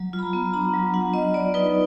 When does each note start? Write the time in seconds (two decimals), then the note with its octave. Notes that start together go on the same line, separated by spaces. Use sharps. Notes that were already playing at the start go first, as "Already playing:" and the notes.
Already playing: F#3
0.13 F4
0.19 B5
0.23 A#5
0.33 B3
0.53 D4 A#5
0.73 F#3
0.94 F4 F#5
1.14 B3 D#5
1.34 B3 D5
1.54 D#4 B4